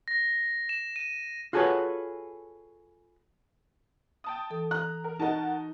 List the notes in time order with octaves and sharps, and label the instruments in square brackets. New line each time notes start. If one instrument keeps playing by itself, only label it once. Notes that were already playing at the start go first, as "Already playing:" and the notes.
[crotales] A#6
E7
D#7
[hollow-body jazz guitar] F4 F#4 G#4 A4 B4 C#5
[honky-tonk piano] G5 A5 D#6
[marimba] E3 A4
[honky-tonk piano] A#5 [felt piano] F#6
[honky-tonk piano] A#4
[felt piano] D#4 D#5 [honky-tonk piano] F#4 A#4 A5